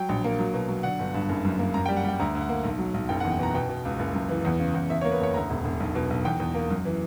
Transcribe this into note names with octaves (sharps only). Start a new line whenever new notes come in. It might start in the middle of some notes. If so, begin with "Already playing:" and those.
Already playing: F#3 G5
A#1
A#3
F#3
B2
F#3
D3 F#5
G1
G2
F#1
F#2
A#3
F#2 A#5
G5
G3
F#5
G3 G5
D2 A#5
D2
F#5
A#3
B1
F#3
B1
F#1 G5
F#5
E2
G5
B2 A#5
B2 G5
B2
C#2
F#1
F#2
E3
E2
C#3
E2
E2 E5
C#5
A#3
B4
F#1 C#5
D2 A#5
E1
E1
B1
B2
B1
E2 G5
E2
A#3
F#2
E3